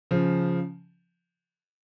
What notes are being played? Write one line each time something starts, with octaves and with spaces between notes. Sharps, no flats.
C#3 F3